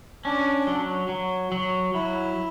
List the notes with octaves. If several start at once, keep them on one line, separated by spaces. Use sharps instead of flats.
C#4 D4
F#3
F#3
F#3
F#3 E4